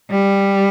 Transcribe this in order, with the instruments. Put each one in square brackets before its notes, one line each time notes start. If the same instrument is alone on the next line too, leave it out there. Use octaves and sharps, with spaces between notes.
[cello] G3